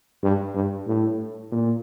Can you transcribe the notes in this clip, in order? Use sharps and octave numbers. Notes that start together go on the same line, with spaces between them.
G2
G2
A2
A#2